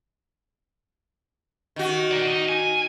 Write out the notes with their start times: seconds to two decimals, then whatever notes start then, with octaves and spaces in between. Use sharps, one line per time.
1.76 D#3 F#4
2.11 A#4 D5
2.27 D#4
2.49 G#5